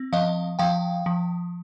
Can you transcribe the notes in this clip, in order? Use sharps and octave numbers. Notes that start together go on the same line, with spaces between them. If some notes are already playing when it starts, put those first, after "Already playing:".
Already playing: C4
F3 D#5 F5
F3 F5 G5
F3